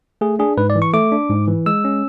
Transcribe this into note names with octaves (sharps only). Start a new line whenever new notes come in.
A3 G#4
D4 G#4
G#2 B4
D5
E3
C#6
A3 D6
D4
G#2
E3
G#3 E6
C#4